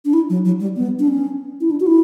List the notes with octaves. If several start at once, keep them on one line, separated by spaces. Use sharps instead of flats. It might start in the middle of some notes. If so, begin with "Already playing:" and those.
D4
E4
F#3
F#3
G3
B3
D4
C#4
E4
D4
F#4
E4